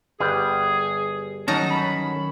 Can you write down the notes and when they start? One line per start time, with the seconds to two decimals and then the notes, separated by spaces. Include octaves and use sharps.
0.20 G1 G3 G#4 B4
1.48 D#3 F#3 C#4 D#4 A5 A#5
1.71 B5